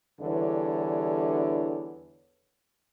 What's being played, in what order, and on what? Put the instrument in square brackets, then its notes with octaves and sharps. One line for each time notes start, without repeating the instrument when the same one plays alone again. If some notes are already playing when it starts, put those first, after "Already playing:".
[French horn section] E2 D3 E3 G3 D4 C#5